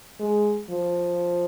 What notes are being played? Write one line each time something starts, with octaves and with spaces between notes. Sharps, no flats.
G#3
F3